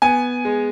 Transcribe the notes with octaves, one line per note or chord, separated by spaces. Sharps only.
B3 G#5
G#3